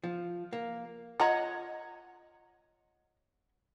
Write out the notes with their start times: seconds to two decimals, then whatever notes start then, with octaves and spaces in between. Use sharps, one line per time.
0.04 F3
0.53 A#3
1.20 F4 C#5 D#5 F#5 A#5